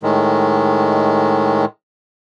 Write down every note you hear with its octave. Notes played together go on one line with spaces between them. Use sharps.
A2 D#3 G#3